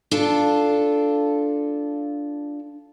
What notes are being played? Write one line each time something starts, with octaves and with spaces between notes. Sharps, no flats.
D4 F4 A4